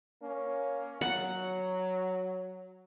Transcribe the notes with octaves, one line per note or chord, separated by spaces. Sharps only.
A#3 C#4
F#3 F#5